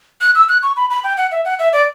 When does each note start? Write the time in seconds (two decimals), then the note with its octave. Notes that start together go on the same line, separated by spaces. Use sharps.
0.21 F#6
0.35 E6
0.49 F#6
0.63 C#6
0.76 B5
0.90 B5
1.04 G5
1.18 F#5
1.31 E5
1.45 F#5
1.59 E5
1.73 D5